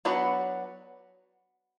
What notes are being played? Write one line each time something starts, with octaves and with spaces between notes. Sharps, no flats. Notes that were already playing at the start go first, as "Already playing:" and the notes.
F#3 B3 D4 F#4 B4